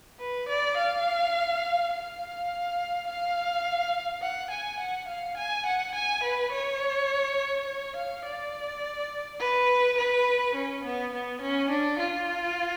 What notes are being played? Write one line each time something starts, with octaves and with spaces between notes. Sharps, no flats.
B4
D5
F5
F5
F5
F#5
G#5
F#5
F5
G#5
F#5
G#5
B4
C#5
C#5
F5
D5
B4
B4
C#4
B3
B3
C#4
D4
F4